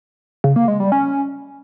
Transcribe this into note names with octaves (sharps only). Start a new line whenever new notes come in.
C#3
A#3
G#3
G3
C#4